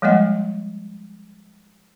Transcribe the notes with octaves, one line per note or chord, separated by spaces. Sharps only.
F3 G3 G#3 A#3 D#5 F#5